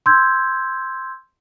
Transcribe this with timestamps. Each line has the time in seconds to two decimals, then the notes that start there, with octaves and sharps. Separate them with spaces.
0.06 C6 E6 G6 G#6